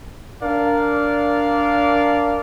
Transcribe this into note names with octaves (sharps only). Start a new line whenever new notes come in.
D4 A#4 D5 F5